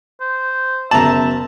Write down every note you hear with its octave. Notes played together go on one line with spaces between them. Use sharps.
C5
F#1 B2 E5 A5 A#5 F#7